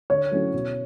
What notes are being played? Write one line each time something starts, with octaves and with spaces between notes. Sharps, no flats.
D3 C#5
F#3 A3 C#4 E4
B2